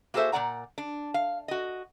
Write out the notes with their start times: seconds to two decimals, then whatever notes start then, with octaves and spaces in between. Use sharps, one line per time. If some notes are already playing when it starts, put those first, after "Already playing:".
0.14 A#3 F#4 G#4 A4 C5 E5
0.32 A#2 A3 D5 F#5 A#5
0.78 D4
1.14 F5
1.48 F#4 D#5